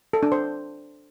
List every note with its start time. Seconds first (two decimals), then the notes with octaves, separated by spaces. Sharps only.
0.13 A4
0.23 D4
0.32 C5